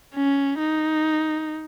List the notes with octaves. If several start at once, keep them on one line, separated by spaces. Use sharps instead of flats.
C#4
D#4